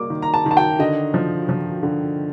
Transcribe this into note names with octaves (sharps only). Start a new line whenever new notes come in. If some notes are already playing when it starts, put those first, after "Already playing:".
Already playing: G3 A#3 D6
D#3
A#5
A5
D#3
A5
G5
D3 D#5
F3
F3
D3